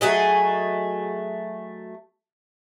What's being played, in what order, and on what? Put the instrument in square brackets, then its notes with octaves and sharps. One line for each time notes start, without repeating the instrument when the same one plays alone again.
[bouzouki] F#3 A3 G#4 D#5